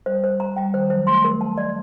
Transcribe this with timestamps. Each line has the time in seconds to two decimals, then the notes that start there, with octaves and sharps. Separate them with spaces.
0.06 G3 C5
0.24 C5
0.40 A#5
0.56 G3 G5
0.74 D#3 C5
0.90 F#3 C5
1.07 A3 C6
1.24 A#4
1.41 A5
1.58 D5